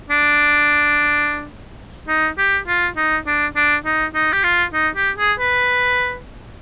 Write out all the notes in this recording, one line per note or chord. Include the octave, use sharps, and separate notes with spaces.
D4
D#4
G4
F4
D#4
D4
D4
D#4
D#4
G4
F4
D#4
G4
G#4
B4